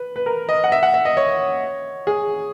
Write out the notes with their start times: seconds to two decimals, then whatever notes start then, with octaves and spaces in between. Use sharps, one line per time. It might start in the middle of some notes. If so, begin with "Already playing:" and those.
Already playing: B4
0.16 B4
0.26 A#4
0.49 D#5
0.64 F#5
0.72 E5
0.83 F#5
0.94 E5
1.05 D#5
1.17 C#5
2.07 G#4